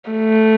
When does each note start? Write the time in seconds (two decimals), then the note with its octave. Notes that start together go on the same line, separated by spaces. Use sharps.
0.10 A3